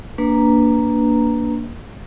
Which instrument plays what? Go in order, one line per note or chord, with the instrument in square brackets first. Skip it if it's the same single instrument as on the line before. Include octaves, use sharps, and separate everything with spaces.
[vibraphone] A#3 D4 B4 A#5